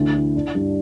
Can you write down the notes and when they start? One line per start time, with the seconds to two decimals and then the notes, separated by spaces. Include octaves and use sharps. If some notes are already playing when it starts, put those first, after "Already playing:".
Already playing: D2 E3
0.15 E4
0.35 D4
0.55 G2